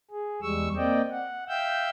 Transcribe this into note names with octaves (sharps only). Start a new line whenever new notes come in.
G#4
E2 G3 G#3 C#6 E6
A#3 C4 D5 D#5 G5
F#5
E5 F5 G5 E6 G6